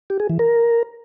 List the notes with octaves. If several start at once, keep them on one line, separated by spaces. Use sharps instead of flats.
G4
G#4
E3
A#4